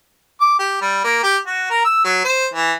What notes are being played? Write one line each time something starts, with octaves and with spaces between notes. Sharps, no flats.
D6
G4
G3
A#3
G4
F#4
A#4
E6
F#3
C5
E3